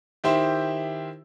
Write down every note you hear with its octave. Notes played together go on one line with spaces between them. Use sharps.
D#3 E4 G4 C5 E5